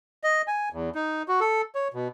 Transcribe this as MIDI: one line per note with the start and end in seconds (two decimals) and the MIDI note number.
0.24 0.42 75
0.48 0.69 80
0.73 0.90 40
0.95 1.23 63
1.28 1.40 66
1.40 1.62 69
1.75 1.88 73
1.94 2.08 47